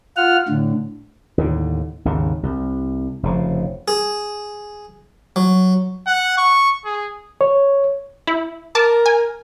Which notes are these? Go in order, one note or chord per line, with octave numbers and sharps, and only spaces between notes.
F4 F#5 F6
A2 D3
D#2 A2 D3
G#1 D#2 C#3
C2
F1 C#3 F3
G#4
F#3
F#5
C#6
G#4
C#5
E4
A#4 A5 D6
G#5